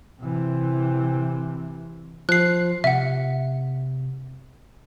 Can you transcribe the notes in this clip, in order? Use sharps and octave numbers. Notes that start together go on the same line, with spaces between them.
C3 E3
F3 F#6 C7
C3 E5 F#5